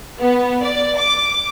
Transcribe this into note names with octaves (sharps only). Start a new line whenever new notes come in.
B3
D5
D6